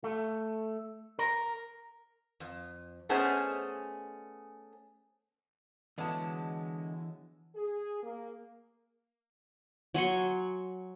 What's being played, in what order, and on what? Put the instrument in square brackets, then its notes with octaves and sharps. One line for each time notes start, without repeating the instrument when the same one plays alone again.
[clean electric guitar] A3
A#4
[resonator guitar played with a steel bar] F2
A3 B3 C#4 G#4 C5 D#5
[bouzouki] D3 G#3 [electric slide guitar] E3 C#5 A5 [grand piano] B3 E4 F#4
[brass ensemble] G#4
A#3
[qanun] F#3 G#5 C6 C#6